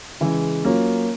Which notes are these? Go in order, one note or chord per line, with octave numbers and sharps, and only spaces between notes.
C#3 E3 G#3
F#3 A#3 C#4 F4